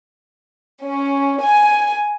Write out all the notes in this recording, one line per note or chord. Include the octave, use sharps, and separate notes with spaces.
C#4
G#5